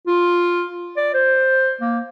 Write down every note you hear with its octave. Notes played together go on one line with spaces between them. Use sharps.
F4
D5
C5
A#3